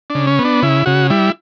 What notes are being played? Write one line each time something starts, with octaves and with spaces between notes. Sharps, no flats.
D4
C#3
C#4
B3
D4
C#3 E4
C#3 F#4
G3 E4